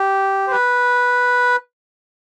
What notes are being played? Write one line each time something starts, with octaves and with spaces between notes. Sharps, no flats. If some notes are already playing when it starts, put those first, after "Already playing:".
Already playing: G4
C5
B4